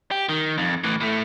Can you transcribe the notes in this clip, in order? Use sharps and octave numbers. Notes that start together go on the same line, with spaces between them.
G4
D#3
F2
A2 E3
A2 A3